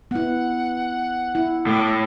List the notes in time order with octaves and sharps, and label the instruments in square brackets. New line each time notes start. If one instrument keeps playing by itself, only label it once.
[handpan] B3 E4 [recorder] F#5
[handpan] E4
[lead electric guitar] A2 [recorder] D6